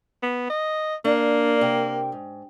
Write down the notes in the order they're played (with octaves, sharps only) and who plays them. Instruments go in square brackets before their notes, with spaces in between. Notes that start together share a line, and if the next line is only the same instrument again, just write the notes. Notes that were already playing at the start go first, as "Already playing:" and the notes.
[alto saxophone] B3
D#5
[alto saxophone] A#3 [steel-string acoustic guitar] D4
[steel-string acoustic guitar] C3 A#4 G5
G#2